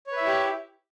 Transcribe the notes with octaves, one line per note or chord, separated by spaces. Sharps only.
E4 G4 B4 C#5 E5